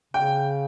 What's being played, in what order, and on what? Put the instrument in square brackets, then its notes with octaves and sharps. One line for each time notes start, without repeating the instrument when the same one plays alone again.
[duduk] C#3 [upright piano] G5